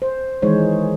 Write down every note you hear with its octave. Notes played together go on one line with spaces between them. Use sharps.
C5
D#3 E3 G#3 D#4 C5 C#5